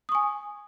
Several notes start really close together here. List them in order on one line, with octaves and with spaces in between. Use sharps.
D#6 C#6 G#5